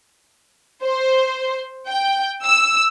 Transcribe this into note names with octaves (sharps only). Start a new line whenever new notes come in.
C5
G5
E6